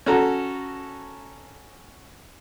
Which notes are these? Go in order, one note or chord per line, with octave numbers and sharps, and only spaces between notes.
C#4 F#4 A4 A#5